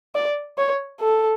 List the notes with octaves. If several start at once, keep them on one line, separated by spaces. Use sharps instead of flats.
D5
C#5
A4